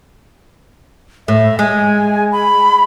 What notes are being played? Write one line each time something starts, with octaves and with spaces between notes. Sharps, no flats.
A2 E5
G#3 G#5
B5